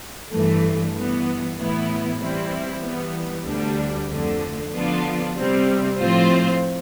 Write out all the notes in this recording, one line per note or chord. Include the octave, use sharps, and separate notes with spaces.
G2 E3 A3
G2 E3 B3
A2 E3 B3 E4
E3 G3 C4 E4
E3 G3 B3
D2 D3 G3 D4
F2 D3 A3
D3 F3 B3 D4 F4
C3 G3 C4
A2 F3 C4 F4 C5